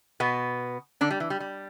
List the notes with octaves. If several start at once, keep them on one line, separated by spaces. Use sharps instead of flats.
B2 B3
D3 D4
G3
E3
G3
G3